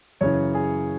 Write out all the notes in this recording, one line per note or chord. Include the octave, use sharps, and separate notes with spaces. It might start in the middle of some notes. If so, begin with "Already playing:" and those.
F#2 C#3 E3 C#5
G#4